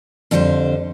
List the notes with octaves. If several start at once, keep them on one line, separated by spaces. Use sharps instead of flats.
F2 D3 G3 G4 C5